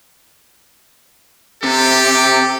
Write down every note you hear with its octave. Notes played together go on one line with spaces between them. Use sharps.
C3 G4 A4